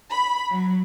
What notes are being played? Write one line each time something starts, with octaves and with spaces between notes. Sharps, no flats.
B5
F#3